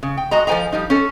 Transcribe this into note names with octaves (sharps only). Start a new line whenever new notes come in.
C#3
G5
G#3 F#4 D#5 A#5
F3 A4 C5 G5 G#5 A#5
F3 G3 D#4
C#4 A4